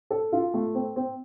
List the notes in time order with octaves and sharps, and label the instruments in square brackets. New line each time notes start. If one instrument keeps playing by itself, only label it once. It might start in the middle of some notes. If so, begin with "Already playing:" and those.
[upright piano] A4
F4
A3
C4
C4